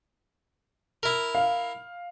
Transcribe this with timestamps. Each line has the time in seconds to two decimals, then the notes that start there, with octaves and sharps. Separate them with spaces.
1.03 E4 A#4
1.35 F5